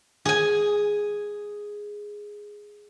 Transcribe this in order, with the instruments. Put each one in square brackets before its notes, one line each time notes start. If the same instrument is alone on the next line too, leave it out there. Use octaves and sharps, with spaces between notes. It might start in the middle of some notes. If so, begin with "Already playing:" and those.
[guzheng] G#4 G#5